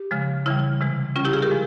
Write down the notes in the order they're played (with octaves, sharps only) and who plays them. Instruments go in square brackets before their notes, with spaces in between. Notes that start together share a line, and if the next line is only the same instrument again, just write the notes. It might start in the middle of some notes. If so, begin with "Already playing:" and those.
Already playing: [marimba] G4
C#3 F3 G#3
C#3 E3 G3 E4
C3 E3 G#3
C#3 G3 C#4 F4
E4 G4
F4 G#4
G4 A#4
F3 G#3